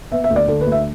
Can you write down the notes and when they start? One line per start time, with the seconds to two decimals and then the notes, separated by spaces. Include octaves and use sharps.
0.12 B3 E5
0.24 E5
0.30 D2
0.36 D5
0.48 D3 A4
0.61 B4
0.67 D2
0.72 E5